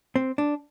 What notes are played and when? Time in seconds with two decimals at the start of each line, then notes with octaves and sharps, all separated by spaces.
0.16 C4
0.38 D4